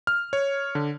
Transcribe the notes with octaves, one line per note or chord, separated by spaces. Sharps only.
F6
C#5
D3